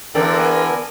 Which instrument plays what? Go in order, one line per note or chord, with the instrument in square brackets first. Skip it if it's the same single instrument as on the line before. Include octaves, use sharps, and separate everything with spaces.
[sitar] E2 D3 [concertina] A4 D5 G5 [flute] A#4
[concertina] B3 G#5